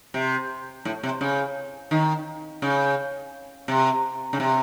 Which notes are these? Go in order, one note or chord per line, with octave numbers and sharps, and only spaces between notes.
C3
A2
C3
C#3
D#3
C#3
C3
C#3
C3